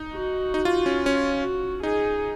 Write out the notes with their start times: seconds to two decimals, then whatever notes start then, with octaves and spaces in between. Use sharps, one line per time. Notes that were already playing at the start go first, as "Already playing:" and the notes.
Already playing: D#4
0.12 F#4
0.54 D#4
0.65 F4
0.86 C#4
1.06 C#4
1.40 F#4
1.83 D#4 G#4